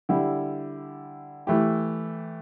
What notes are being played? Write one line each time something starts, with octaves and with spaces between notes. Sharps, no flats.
D3 G3 E4 G4
E3 A3 E4 G4